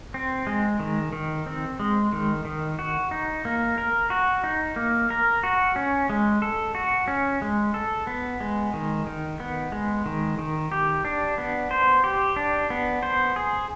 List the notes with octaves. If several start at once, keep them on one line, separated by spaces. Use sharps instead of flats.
C4
G#3
D#3
D#3
C4
G#3
D#3
D#3
F#4
D#4
A#3
A#4
F#4
D#4
A#3
A#4
F#4
C#4
G#3
A4
F#4
C#4
G#3
A4
B3
G#3
D#3
D#3
B3
G#3
D#3
D#3
G4
D4
B3
C5
G4
D4
B3
C5
G#4